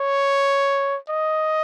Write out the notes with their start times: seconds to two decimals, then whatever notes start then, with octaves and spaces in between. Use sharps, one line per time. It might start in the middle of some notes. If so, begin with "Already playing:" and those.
Already playing: C#5
1.09 D#5